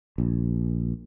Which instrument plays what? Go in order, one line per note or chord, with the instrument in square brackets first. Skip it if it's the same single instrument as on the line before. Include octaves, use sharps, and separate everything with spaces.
[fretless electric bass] A#1